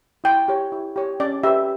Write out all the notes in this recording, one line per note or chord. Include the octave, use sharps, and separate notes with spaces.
E4 G5
G4 C#5
E4
G4 C#5
C#4 D5
G4 B4 E5